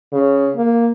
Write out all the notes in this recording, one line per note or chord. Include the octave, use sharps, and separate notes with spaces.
C#3
A#3